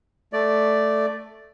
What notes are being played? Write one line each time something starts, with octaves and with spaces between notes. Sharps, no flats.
A3 D5